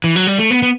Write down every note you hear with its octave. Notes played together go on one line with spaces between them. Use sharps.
E3
F#3
G3
A3
B3
B3